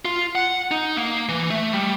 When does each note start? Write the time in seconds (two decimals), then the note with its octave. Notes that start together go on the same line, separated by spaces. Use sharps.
0.05 F4
0.35 F#5
0.71 D#4
0.97 A#3
1.29 E3
1.50 A3
1.72 G3